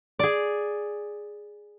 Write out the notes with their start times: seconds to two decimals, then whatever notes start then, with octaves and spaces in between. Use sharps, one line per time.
0.19 G#4 D5